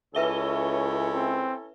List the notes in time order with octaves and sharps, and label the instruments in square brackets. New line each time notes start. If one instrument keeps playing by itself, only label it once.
[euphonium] C#2 [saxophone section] C#4 E4 A4 [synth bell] B4 E5 G7 [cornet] C#5
[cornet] C4